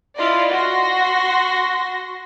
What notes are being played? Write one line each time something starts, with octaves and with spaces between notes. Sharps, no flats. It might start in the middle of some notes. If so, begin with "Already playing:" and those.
E4 F4 D5 D#5
F#4 C6 A#6